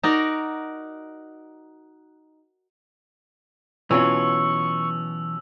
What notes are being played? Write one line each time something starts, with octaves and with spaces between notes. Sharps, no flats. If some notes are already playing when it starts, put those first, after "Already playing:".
D#4 F#4 A#4 D5
B2 E3 F#3 C#4 F4 C#6 E6 F7